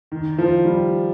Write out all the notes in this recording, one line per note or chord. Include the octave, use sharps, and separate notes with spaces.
D#3
F3
G3